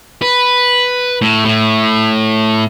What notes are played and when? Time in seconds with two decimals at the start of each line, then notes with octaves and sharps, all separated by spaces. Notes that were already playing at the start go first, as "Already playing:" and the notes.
0.22 B4
1.22 A2
1.45 A2